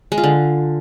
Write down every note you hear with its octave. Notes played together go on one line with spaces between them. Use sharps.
G#3
F4
D3